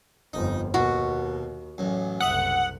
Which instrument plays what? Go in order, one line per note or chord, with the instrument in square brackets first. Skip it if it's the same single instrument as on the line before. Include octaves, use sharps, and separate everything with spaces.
[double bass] G1 F2 [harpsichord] D#4
[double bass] D#2 [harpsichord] B2 [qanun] F#4
[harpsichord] A1 F#2
[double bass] F#1 C2 [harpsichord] E5 D#6 [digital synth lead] F#5